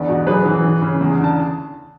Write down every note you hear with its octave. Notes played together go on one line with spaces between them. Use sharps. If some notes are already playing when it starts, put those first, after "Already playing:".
Already playing: E2 D3 B4 D5
B2
F#2 G#4 B4
E3
E3
C#3
E2
D3
A5